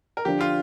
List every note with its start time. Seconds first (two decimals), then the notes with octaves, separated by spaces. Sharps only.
0.17 A#4
0.25 D3 F3 D4 G4
0.41 F4